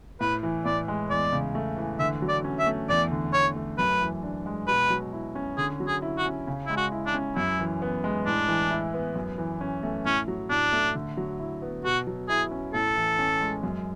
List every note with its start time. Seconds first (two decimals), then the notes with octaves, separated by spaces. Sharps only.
0.20 A2 B4
0.43 E3
0.65 A2 D5
0.88 G#3
1.10 E2 D5
1.32 C#3
1.55 A3
1.77 E3
1.99 D3 E5
2.22 F#3
2.29 D5
2.44 C#4
2.59 E5
2.67 A3
2.89 E2 D5
3.11 D3
3.34 E2 C#5
3.56 A3
3.78 F#2 B4
4.01 E3
4.23 D4
4.46 G#3
4.68 B2 B4
4.90 F#3
5.13 E4
5.35 C#4
5.57 D3 G#4
5.80 F#3
5.88 G#4
6.02 E4
6.18 F#4
6.25 C#4
6.47 C#3
6.66 G#3 E4
6.77 F#4
6.92 E4
7.06 D4
7.15 C#4
7.36 F#2 E4
7.59 E3
7.82 B3
8.04 G#3
8.26 A2 D4
8.48 E3
8.71 E4
8.94 B3
9.15 F#2
9.38 E3
9.61 C#4
9.83 A3
10.05 A2 C#4
10.28 F#3
10.50 A2 D4
10.73 A3
10.95 D3
11.17 F#3
11.40 E4
11.62 B3
11.84 B2 F#4
12.07 F#3
12.29 E4 G#4
12.51 C#4
12.74 A2 A4
12.96 E3
13.19 C#4
13.41 G#3
13.63 F#2